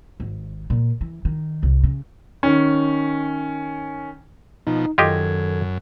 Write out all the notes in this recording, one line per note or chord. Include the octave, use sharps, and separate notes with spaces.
G#1
A#2
E3
D#3
C2
C#3
D#3 C#4
B2 F3 D#4
F#2 D#3 F4 G4 A4 D#5 G#6